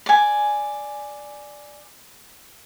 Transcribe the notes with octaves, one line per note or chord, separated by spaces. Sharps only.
D5 G#5